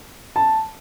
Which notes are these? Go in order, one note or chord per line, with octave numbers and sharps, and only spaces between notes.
A5